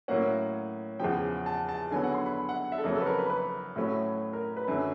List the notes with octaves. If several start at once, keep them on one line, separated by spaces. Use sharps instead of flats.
A2 F#3 A#3 C#4 F#5
E2 C#3 F3 G5
A5
A5
D3 F#3 B3 G#5
F#5
C6
B5
F#5
E5
A4
F2 C#3 F#3 A#3 A#4
A4
B4
A#4
B4
B4
A2 F#3 A3 C#4
A#4
B4
F#2 D3 F#3